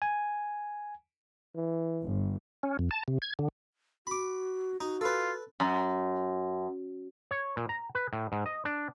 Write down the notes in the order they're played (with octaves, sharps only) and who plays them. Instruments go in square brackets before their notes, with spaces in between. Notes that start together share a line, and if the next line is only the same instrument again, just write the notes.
[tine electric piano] G#5
[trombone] E3
[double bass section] G1
[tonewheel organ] C#4
F2
A5
C3
G#6
D3
[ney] F#4 [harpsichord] B5 D6
[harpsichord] D#4 [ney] F#4
[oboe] F4 [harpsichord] A4 B4
[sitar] F#2
[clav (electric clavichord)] C#5
A#2
A#5
B4
A2
G#2
D#5
D4